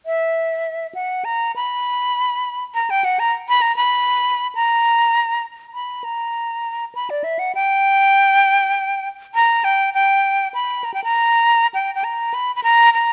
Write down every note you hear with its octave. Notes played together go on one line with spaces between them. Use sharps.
E5
F#5
A#5
B5
A#5
G5
F#5
A#5
B5
A#5
B5
A#5
B5
A#5
B5
D5
E5
F#5
G5
A#5
G5
G5
B5
A#5
G5
A#5
G5
G5
A#5
B5
B5
A#5
A#5